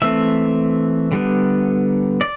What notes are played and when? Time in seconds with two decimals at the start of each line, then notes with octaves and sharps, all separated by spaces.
0.02 E3 A3 C4 E5
1.12 D3 G3 B3
2.21 D5